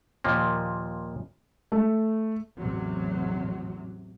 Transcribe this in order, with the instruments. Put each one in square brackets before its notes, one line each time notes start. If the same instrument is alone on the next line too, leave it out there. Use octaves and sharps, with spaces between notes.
[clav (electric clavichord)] D#2 A#2 F3 A#3
[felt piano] A3
[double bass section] A1 E2 C3 F#3